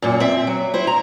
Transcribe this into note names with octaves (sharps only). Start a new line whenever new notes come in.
F#2 A#2
C4 E5
F#3
E4 C5
A#5